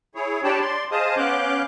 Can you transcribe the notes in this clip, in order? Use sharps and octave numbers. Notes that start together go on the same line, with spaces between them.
E4 G#4 C#5
D4 G4 C#5 G5 A5 B5
D5 C6
G#4 C5 D#5 F5 A5 D#6
B3 C#4 F5 D6 F#6 G6